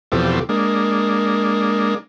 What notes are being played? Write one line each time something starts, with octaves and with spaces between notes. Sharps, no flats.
E2 B2 F3 C4 G4 A4
G#3 A#3 D4